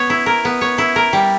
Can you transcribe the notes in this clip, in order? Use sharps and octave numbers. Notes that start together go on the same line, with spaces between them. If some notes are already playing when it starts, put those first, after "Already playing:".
Already playing: B3 C#5
E4
A#4
B3
C#5
E4
A#4
G3